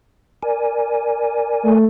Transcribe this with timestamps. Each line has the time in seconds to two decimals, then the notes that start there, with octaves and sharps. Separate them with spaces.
0.43 A#4 D5 G#5
1.63 A3